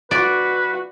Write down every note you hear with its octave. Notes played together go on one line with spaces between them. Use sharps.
F#4 B4 D5